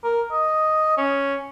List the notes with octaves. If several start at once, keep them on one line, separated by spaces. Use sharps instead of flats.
A#4
D#5
C#4